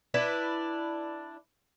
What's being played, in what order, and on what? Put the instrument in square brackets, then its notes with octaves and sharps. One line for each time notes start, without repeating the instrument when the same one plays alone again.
[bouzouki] D4 E4 B4